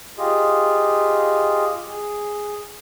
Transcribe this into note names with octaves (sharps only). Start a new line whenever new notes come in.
F4 G4 G#4 D#5
G#4